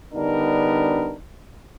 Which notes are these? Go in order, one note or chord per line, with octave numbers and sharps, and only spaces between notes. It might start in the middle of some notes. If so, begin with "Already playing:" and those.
D3 G3 B3 D4 D#4 A#4